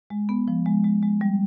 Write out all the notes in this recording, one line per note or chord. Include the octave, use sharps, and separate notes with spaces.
G#3
B3
F3
G#3
G#3
G#3
G3